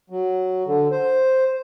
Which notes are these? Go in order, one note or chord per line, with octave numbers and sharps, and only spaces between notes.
F#3
D3
C5